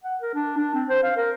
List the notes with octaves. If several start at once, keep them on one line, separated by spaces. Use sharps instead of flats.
F#5
A#4
D4
D4
C4
C5
F5
A#4